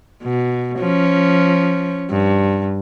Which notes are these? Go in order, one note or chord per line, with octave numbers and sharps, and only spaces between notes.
B2
F3 C#4
G2